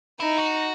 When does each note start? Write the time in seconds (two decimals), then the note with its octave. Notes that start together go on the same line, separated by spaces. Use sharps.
0.20 D#4 E4
0.38 F#4